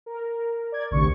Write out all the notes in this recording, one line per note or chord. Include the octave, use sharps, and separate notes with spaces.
A#4
D5 G#6
A1 D2 C3 C#6